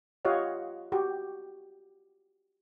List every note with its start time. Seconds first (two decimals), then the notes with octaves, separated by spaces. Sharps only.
0.25 F4 G4 C#5 D#5 F5 F#5
0.92 F#4 G4